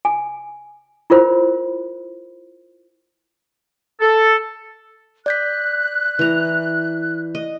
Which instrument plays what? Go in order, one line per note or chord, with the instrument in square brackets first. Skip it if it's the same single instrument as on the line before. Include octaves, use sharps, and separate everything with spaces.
[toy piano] G#5
E4 F4 A#4 C5 B5
[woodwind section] A4
[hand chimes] D5 G6 B6 [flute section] F#6
[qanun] E3 A#5
D#5